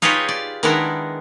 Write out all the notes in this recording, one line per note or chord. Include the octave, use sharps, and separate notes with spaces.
D#4 F4 G4 G#4 B4 C#5
D5
D#3 G#3 B3 D4 E4 A#4